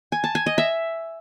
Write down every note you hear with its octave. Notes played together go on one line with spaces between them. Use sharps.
G#5
A5
G#5
D#5
E5